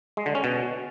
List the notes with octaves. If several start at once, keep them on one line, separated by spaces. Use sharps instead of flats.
G#3
D3
C#4
B2